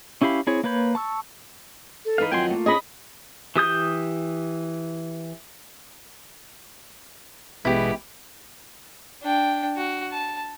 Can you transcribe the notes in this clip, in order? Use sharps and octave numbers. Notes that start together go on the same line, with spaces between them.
C#4 E4 G4 F5 B5
C4 E4 G#4 C#5
A#3 B4 C#5 B5 G6
A5 C#6 E6
A4
E3 D#4 F5 B5
F2 D#3 F#3 F4 G5 G#5 C6
A3 A#3
C#4 D4 G#4 D#5 B5
E3 G4 D#6 G6
A1 B2 G#3 B3 E4 G4
D4 G5
F#4
A5